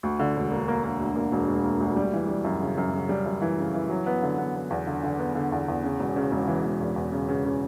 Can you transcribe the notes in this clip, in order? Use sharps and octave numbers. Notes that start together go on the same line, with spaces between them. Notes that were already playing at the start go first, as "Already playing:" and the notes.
D2
D3
E1
A#3
A#3
A#3
D2
A#3
E1
E1
A#3
D2
G3
E3
G3
F#2
C#3
F#2
C#3
G3
F#2
E3
C#3
E3
F#3
B3
D3
B3
B3
E2
D3
D3
B3
D3
E2
E2
C#3
E1
C#3
E1
E3
E1
E2
E2
C#3
C#3
C#3